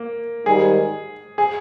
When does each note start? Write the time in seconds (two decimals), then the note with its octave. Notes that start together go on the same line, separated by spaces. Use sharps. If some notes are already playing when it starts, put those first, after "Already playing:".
Already playing: A#3
0.46 G#2 D#3 G3 G#4
1.38 G#4